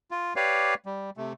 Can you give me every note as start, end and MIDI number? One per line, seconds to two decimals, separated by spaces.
0.11 0.34 65
0.36 0.74 67
0.36 0.74 71
0.36 0.74 73
0.36 0.74 74
0.36 0.74 77
0.86 1.10 55
1.17 1.33 48
1.17 1.33 57